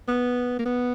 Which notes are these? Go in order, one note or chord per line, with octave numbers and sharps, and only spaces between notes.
B3
A#3
B3